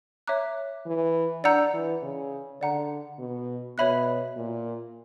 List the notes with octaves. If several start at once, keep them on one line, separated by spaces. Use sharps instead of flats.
C#5 E5 A#5 D6 F#6
E3
D4 D5 F#5 A#5 E6 G6
E3
C#3
D3 D5 F#5 A#5
B2
B2 C#5 E5 B5 F#6
A#2